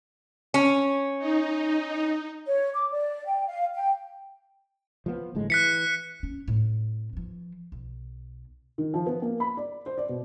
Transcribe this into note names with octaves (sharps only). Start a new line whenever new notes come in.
C#4
D#4
C#5
D6
D5
G5
F5
G5
F3 G3 B3
G1 A2 G#3
E3 F#6 B6 C#7
C#4
A2 C4
E3 F3
B1
D#3
F3
B3
A#3
B5
D5
C5
D5
B2